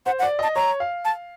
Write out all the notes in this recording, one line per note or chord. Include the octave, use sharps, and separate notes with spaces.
C5 F#5
F#5
D5
D#5 A5
C#5 A#5
F5
A5